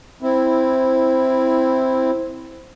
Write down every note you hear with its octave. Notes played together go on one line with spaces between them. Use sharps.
C4 E4